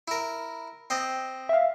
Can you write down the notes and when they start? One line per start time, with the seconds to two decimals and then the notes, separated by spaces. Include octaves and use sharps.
0.08 E4 A#4
0.90 C4 D#5
1.49 E5 F5